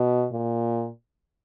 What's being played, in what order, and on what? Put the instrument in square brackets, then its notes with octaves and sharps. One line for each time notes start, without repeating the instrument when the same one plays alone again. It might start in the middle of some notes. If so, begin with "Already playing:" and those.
Already playing: [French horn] B2
A#2